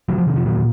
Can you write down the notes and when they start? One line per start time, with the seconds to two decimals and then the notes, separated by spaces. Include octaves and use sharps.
0.09 C3 D#3 F#3
0.18 F3
0.27 C3 D#3
0.36 F3
0.45 A#2 D#3 F#3